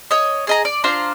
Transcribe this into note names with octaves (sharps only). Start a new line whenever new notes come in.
C#5 D#5
G#4 D#5 A#5
D5
D4 F4 C5 A#5